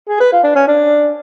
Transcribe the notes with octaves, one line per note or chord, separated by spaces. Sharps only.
G#4
B4
F4
D4
C#4
D4